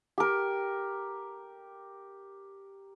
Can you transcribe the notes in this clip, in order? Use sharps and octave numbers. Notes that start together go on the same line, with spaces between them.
G4 A#4